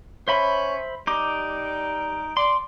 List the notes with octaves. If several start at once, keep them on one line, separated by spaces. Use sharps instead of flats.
C#4 C5 E5 B5
G3 D#4 D6
D5 C6